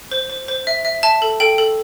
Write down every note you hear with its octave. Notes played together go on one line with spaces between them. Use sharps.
C5
C5
C5
E5
E5
E5 A5
A4
A4 G5
A4